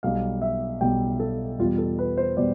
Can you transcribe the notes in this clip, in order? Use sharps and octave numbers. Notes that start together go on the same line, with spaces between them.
B1 B2 G3 F5
E5
B1 B2 G3 G5
A4
E2 B2 G3 F4
A4
B4
C5
B2 G3 D5